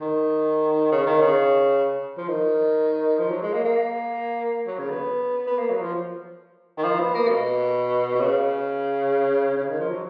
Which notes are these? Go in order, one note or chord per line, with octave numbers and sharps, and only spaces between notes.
D#3
C#3
D#3
C#3
F3
D#3
F3
F#3
G#3
A#3
A#3
F#3
C#3
B3
B3
A#3
F#3
F3
D#3
F3
B3
A#3
B2
B2
C#3
C#3
D#3
F3
F#3